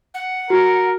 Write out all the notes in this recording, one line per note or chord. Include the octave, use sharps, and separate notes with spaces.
F#5
F#4 A#4